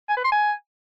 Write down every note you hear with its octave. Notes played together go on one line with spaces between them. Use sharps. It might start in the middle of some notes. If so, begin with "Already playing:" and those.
G#5
B4
C6
G#5